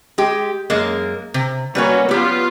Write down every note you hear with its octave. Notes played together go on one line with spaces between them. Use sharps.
G#3 G4
F#2 G#3 A#3
C3
G3 A#3 C#4 F#4 B4 C#5
F#3 B3 F4 G4